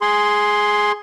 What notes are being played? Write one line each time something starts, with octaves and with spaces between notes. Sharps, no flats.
G#4 C6